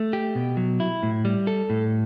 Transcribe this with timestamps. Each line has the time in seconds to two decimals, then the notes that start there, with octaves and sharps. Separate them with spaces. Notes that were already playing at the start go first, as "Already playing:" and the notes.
Already playing: A3
0.13 G4
0.35 B2
0.57 F#3
0.80 E4
1.03 A2
1.25 G3
1.47 A4
1.70 A2